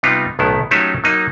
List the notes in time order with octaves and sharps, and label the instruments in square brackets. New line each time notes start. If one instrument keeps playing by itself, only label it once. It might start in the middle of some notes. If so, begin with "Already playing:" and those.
[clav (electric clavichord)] C3 G3 B3 D#4 F4
B1 A2 D#3 B3 E4
F#3 A3 C#4 D#4 G4 E5
F#3 A#3 D#4 D#5